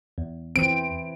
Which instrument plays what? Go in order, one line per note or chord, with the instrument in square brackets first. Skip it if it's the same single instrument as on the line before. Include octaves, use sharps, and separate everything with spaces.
[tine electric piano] E2
[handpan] E3 C4 [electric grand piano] D7